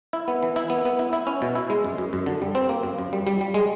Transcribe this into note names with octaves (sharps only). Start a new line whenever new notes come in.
E4
B3
E3
E4
B3
B3
E4
E4
C#4
B2
E4
G#3
F#2
F#2
F#2
D3
G3
C4
A#3
F#2
F#2
G3
G3
G3
G#3